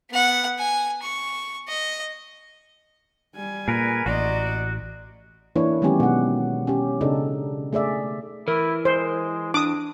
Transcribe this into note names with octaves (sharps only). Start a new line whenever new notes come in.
B3 F#5
G#5
C#6
D#5
G3 G#5
A#2 G#4 A#4 B4
A1 F#4 D5 D#5 A#5 C6
E3 A#3 D4 E4 C#5
D#3 F#3 G#3 B3 C#4 G4
B2 F#5
C#4 G4
C#3 D4 D#4 A4
A3 G#4 D5 E5
E3 E4 A#4
G#3 C5
F2 D4 D6 D#6